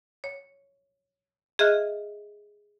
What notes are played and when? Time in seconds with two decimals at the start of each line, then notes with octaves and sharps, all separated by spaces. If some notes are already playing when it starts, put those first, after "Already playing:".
0.24 C#5
1.59 G#4 D#5 E5 F6 F#6